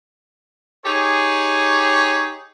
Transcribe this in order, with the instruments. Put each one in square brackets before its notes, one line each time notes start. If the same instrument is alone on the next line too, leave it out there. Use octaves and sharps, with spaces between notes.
[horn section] D#4 G4 G#4 C#5